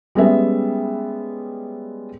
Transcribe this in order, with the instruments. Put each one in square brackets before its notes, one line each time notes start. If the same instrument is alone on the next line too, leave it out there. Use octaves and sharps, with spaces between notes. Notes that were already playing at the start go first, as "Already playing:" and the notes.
[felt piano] G3 G#3 B3 C#4 A4 E5